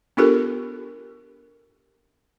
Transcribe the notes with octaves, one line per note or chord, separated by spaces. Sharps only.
B3 D4 F4 G4 A4 A#4